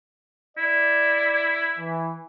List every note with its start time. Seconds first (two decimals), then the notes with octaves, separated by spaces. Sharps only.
0.58 E4 D5
1.78 E3